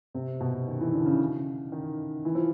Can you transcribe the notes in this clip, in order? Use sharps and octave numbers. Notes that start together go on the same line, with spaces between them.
C3
B2
D#3
E3
D3
C#3
D#3
E3
F3